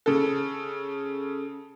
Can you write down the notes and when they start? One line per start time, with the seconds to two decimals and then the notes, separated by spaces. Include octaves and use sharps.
0.06 C#3 A4